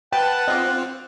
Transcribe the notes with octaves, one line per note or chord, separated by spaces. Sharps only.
B4 F#5 G5 A5
C4 F4 D#5 D6